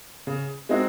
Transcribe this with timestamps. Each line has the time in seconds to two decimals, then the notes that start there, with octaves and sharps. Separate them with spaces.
0.27 C#3
0.69 G#3 C4 D#4 F#4